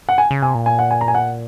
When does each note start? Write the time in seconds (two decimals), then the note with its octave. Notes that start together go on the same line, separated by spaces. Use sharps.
0.09 F#5
0.18 G#5
0.31 C#3
0.42 C3 G#5
0.55 A#2
0.66 G#5
0.79 F#5
0.91 G#5
1.01 A#5
1.08 G#5
1.15 F#5